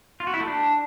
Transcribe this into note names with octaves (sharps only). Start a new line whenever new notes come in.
F4
F#4
E4
A3
D4